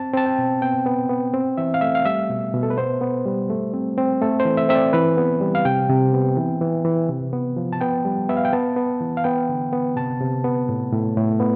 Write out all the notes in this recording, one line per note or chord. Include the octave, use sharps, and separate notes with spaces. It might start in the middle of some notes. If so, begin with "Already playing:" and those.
Already playing: C4 A5
C4 A5
G5
B2
B3 G5
B3
B3
C4
E3 E5
F5
A3 E5
F5
G3 E5
B2
B2
A4
B4
B3 C5
B3
G3
A3
C4
C4
A3 A4
C5
E3
E5
C4 E5
D5
E3 B4
B3
G3
F5
C3 G5
C3
B3
E3
E3
E3
C3
B3
F3
A5
B3 G5
G3
B3 E5
F5
G5
B3 A5
B3
E3
F5
B3 G5
D3
B3
C3 A5
C3
B3
A2
A2
A2
B3